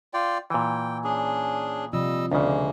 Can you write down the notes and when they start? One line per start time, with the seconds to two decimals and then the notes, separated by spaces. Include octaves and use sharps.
0.14 F4 D5 G5
0.50 A#2 E3 G5
1.04 C#4 D4 G#4
1.93 C3 F3 G3 F4 D#5 E6
2.32 D2 C#3 G#3 A#3 D4 D5